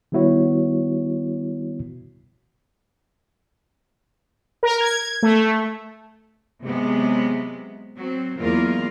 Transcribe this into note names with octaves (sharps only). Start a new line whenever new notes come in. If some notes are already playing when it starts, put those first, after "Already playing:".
D#3 G3 B3 E4 F#4 C#5
A#4
G#6
A3
C3 F#3 G#3 B3
F#3 C4
E2 F#3 G#3 A#3 F4 A#4